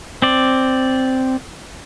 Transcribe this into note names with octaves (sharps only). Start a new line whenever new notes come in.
C4 D5